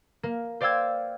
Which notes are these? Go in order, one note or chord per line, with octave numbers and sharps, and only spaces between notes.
A#3
C5 D5 F5 G5 E6 G#6